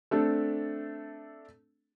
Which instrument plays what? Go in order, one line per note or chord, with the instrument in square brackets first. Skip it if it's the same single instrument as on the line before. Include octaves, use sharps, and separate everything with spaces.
[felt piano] A3 C4 D4 A4